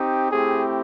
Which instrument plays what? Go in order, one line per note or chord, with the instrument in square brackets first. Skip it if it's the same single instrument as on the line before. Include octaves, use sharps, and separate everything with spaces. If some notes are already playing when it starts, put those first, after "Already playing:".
Already playing: [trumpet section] C4 D#4 G4
A3 C4 E4 G4 G#4